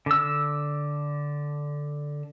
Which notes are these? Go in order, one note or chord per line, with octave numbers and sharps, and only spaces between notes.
D3 E6